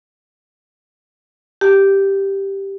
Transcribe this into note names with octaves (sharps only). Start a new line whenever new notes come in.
G4